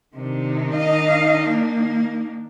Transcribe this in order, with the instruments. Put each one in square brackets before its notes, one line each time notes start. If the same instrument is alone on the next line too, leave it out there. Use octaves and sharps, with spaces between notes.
[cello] C3 [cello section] D#3 D4 D#4
[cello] D#5 F5
A#3